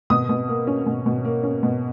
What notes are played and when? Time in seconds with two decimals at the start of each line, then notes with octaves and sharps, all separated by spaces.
0.10 B2 D#6
0.29 B2
0.48 A#3
0.67 C#4
0.86 B2
1.06 B2
1.25 A#3
1.43 C#4
1.63 B2